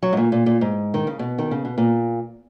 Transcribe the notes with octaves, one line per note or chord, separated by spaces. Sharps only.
F#3
G#2
A#2
A#2
A#2
G#2
D#3
C#3
B2
D#3
C#3
B2
A#2